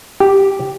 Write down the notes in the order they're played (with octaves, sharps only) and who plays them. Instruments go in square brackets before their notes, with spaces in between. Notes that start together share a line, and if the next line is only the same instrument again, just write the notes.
[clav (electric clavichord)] G4